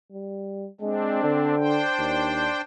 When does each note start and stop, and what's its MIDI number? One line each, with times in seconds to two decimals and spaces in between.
0.12 0.68 55
0.81 1.22 56
0.81 1.56 60
0.81 1.56 62
1.23 1.82 50
1.57 2.61 62
1.57 2.61 72
1.57 2.61 79
1.98 2.48 39